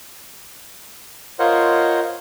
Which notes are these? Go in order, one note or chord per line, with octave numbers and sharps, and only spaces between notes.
F4 A#4 C5 C#5 D#5 F#5